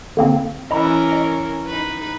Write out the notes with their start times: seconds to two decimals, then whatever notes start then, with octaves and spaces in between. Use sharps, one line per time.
0.17 D3 A#3 C4
0.71 E3 C#4 A#4 D#5 A#5 B5
1.12 D#5
1.67 D#4 B4